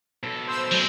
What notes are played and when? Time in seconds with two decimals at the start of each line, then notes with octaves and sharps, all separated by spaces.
0.23 B2 A4
0.47 C5 E6
0.71 F#3 G#3